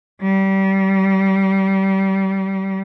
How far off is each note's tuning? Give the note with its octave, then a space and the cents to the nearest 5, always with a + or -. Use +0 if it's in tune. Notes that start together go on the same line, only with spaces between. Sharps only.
G3 -25